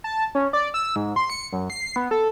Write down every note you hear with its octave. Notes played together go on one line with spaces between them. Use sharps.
A5
C#4
D5
E6
G#2
C6
C#7
F#2
C7
B3
A4